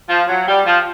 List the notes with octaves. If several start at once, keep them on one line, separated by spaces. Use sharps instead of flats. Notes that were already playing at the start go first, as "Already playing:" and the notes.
F3
F#3
G3
F3